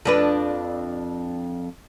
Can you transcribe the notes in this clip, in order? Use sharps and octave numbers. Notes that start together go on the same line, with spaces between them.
F2 D4 B4